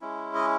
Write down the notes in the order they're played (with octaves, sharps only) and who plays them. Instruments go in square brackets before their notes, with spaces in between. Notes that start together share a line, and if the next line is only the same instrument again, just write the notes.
[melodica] G#3 C#4 E4
D#5